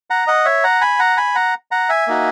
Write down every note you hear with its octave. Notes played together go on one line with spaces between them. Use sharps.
F#5 A#5
D#5 F#5
C#5 E5
F#5 A#5
G#5 B5
F#5 A#5
G#5 B5
F#5 A#5
F#5 A#5
E5 G#5
A#3 D#4 F#4